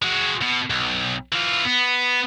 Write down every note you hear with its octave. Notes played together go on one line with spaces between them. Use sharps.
G#3 F#4
B2
B1
E3 F4
B3